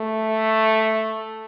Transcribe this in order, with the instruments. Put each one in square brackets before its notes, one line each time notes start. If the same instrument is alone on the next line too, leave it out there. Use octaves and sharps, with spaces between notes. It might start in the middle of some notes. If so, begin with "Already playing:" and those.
Already playing: [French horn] A3